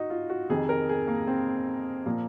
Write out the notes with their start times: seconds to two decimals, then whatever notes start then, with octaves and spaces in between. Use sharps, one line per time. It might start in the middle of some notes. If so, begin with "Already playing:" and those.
Already playing: D#4 F#4
0.10 F4
0.30 F#4
0.49 F2 C3 D#3 G#4
0.69 A#4
0.89 G#4
1.08 A#3
1.27 C4
2.05 A#2 F3 A#3